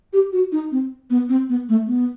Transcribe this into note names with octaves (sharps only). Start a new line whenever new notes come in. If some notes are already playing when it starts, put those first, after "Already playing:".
G4
F#4
D#4
C4
B3
C4
B3
A3
B3